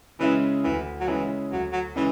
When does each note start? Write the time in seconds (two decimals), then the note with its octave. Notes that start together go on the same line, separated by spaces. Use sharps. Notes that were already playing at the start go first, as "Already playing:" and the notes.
0.20 C#3 E3 G#3 C#4 E4
0.64 D2 E3
1.00 F#3
1.08 C#3 E3 G#3 C#4 E4
1.51 D2 F#3
1.72 F#3
1.96 C#3 E3 G#3 C#4